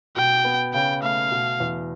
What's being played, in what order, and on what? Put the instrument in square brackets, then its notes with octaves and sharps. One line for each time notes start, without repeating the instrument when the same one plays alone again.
[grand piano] B2 [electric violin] G5
[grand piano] B3
[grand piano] C#3 [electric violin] G5
[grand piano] A3 [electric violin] F5
[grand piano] B2
E2